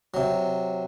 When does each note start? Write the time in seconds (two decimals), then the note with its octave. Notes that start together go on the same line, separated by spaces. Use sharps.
0.14 C3 F#3